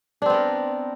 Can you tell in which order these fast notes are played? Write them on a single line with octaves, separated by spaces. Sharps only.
D4 C4 B3 A#4